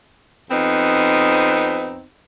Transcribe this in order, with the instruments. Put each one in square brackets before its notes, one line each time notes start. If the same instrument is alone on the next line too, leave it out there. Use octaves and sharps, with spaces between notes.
[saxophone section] F2 B3 C4 D#4